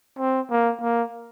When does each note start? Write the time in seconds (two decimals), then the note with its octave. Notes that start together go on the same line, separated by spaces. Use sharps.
0.19 C4
0.51 A#3
0.81 A#3